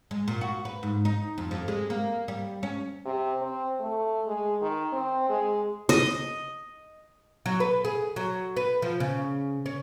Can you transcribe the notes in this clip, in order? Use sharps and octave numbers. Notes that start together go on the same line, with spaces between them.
G#3
A#2
F#4
B4
G#2
D#4
F2
F2
G#3
A#3
G3
C#4
C3
C4
A3
G#3
D#3
C4
G#3
D#5
F#3
B4
G#4
F#3
B4
F3
C#3
C#4